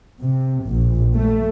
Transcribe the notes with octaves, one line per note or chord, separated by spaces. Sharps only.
C3
A#1
A3